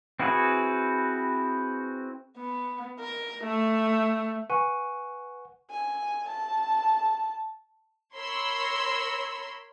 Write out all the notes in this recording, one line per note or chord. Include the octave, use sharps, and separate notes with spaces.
C4 E4 F#4 G#4 B4
B3
A#4
A3
B4 F#5 G#5 C#6 D#7
G#5
A5
A#4 C#5 B5 C6 E6